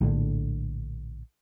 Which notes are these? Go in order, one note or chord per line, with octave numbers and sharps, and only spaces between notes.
A#1 A2 D3